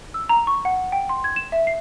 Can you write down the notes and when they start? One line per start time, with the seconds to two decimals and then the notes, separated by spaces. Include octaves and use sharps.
0.14 E6
0.29 A#5
0.47 C#6
0.65 F#5
0.92 G5
1.09 C6
1.24 G#6
1.36 E7
1.52 E5
1.67 C7